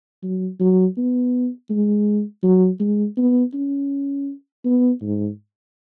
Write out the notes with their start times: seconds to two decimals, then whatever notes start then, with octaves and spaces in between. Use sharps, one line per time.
0.23 F#3
0.60 F#3
0.97 B3
1.70 G#3
2.43 F#3
2.80 G#3
3.17 B3
3.54 C#4
4.65 B3
5.02 G#2